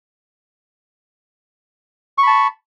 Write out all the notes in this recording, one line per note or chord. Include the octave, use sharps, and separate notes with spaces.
A5 B5 C#6